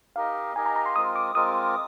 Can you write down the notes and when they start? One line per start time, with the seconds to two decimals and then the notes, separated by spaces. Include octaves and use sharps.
0.16 D#4 G4 A#4 D#5 F5
0.56 D#4 G4 A#4 D#5 G#5
0.66 A#5
0.76 A#5
0.86 C6
0.96 G#3 C4 F4 A#4 D#6
1.16 D6
1.35 G#3 C4 F4 A#4 D#6